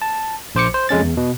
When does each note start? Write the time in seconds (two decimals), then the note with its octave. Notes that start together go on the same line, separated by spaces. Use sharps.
0.02 A5
0.55 A#1 C5 D6 C#7
0.74 C5
0.89 F2 G#3 C#4 A6
1.02 E2
1.17 B2